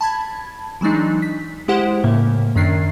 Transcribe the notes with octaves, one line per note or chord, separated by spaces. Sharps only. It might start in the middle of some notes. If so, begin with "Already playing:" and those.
A5 B5 G#6
E3 F#3 G#3 D4 D#4
B6
G#3 E4 G4 C5 F#5
A2 C#3 A#3
F#2 D#3 C#4 D4 C7